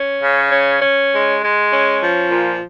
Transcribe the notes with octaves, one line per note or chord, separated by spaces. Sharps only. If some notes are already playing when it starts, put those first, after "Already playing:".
Already playing: C#4
C#3
C#4
C#4
G#3
G#3
C#4
F3
A#2